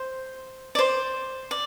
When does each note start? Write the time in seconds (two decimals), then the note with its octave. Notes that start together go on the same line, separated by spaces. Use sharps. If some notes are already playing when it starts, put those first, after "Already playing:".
Already playing: C5
0.75 D5
0.79 C5
1.51 D5